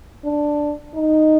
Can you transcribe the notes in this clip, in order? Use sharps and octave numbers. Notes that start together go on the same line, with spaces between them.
D4
D#4